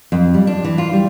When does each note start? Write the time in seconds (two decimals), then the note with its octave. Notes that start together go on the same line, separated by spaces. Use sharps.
0.12 F2
0.34 G3
0.47 D4
0.64 E3
0.78 F4
0.93 G3